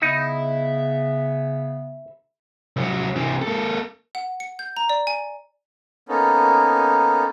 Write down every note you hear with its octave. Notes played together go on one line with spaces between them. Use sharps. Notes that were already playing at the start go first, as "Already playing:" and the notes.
C#3 B3 D#4 E5 B5
C2 F#3
C3 E3
A#3 A4
F#5
C#7
G6
A#5
D5
G#5
A#3 B3 C#4 D#4 A4